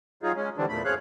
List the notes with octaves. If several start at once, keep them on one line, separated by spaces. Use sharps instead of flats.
F#3 D#4 F4 G#4
G#3 C#4
D3 E3 G3 C4 D4
E2 A#2 A3 B5
F#2 C4 G#4 C#5 F5 F#6